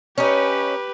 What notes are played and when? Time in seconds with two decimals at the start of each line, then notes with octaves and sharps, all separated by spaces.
0.18 C#4 D#4 G4 B4